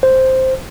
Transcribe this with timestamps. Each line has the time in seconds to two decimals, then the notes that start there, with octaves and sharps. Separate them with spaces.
0.03 C5